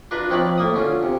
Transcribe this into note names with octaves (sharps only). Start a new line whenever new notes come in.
D4 F4 A#4 B4
F3 C4 D#4 C#5 D5 B5
A2 A#3 D#6
D3 C#4 F4
C3